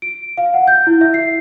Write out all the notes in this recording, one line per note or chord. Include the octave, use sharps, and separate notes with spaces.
D7
F5
F#5
G6
E4
E5
C7